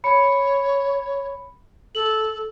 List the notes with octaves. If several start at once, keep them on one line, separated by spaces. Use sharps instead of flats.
C#5 B5 C#7
A4 F#7